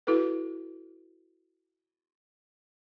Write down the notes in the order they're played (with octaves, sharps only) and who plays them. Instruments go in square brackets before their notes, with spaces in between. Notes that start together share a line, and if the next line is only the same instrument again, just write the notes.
[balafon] E4 F#4 A4 B4